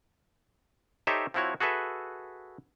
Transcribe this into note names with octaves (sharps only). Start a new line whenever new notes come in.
D#4 G4 A4 C5 C#5 E5
F3 C4 E4 F#4 C#5
F#4 G#4 A4 B4 E5